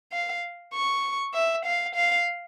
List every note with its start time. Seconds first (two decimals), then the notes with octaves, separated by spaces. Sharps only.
0.12 F5
0.74 C#6
1.34 E5
1.65 F5
1.95 F5